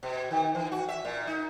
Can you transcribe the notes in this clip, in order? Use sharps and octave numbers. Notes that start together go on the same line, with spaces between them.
B2
D#3
E3
F#4
E5
A#2
D#4